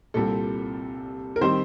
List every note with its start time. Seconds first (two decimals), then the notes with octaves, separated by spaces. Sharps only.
0.14 C2 A#2 G3 C4 A4
1.36 A#4
1.41 D#3 G3 C4 C5